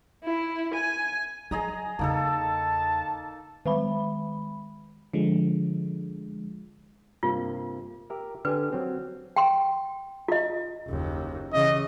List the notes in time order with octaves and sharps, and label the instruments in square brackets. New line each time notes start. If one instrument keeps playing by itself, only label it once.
[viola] E4
G#5
[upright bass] F#3 [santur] G#4 D#5 A#5
[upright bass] E2 C#3 [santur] A#3 D#4 A4 [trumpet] A5
[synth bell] D#3 G#3 B5
[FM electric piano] D3 F3 G#3
[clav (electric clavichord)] G2 C3 A#3 [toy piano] F4
[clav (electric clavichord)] G4 A#4 E5
[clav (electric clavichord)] D3 G4 G#5 [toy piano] B4
[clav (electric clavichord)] F#3 C4
[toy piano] G5 C6
F4 D#5
[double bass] F#1 D#2
[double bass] C#3 E3 [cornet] D#5